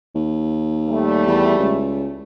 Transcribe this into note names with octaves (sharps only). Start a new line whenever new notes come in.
D#2
G3 A3
E2
C#2